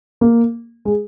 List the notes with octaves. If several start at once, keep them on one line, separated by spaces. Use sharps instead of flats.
A#3
G#3